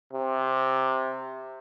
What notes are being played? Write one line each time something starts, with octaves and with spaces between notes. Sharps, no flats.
C3